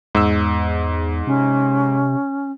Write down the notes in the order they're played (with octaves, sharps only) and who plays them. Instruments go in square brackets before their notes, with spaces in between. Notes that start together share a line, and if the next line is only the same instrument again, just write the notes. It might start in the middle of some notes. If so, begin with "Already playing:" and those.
[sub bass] E2 [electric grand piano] G#2 E6
[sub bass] C3 [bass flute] C#4